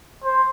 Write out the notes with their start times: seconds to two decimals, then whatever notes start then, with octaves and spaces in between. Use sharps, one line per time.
0.24 C5